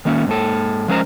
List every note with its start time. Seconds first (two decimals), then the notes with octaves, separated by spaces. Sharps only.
0.05 D#3 A#3 C#4
0.27 G#2 A#3 A4
0.88 F3 G#3 C#4 A#4 C5 A#5